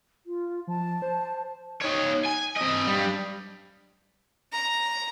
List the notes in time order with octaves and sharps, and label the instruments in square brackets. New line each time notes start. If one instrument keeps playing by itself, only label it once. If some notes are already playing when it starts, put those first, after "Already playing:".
[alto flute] F4
[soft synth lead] F3 [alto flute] A5
[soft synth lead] C5
[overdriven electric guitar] D#4 C#5
G#5
C4 D#5
G2 G3
[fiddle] A#5